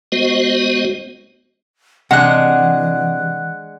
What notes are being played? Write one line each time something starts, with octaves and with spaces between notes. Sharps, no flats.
G#3 B3 F#4 C5 D#5
C3 E3 G#3 D4 F#5 F#6